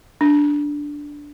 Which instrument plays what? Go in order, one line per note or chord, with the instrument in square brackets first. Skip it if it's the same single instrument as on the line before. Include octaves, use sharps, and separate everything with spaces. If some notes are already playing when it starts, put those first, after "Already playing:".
[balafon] D4